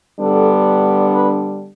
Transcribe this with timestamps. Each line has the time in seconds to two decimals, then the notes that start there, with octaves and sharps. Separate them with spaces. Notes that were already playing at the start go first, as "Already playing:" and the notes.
0.19 D3 G3 B3 D4 A4
1.13 B4